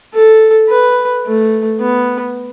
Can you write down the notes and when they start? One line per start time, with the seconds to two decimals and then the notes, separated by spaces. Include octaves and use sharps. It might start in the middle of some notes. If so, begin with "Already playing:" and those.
0.14 A4
0.69 B4
1.26 A3
1.81 B3